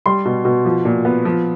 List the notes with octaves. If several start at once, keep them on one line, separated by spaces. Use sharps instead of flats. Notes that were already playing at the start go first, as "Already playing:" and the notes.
G3 C6
B2
B2
F3
A#2
B3
F3